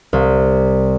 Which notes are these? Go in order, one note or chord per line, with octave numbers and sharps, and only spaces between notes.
C2